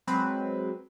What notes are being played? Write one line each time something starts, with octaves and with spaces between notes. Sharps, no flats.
F#3 G#3 C4 B4